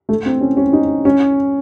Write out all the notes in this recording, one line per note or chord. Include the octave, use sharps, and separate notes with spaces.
A3
C4
C#4
C#4
D#4
C#4